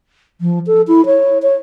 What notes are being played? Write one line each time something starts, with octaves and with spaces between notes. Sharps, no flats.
F3
A4
E4
C#5
C#5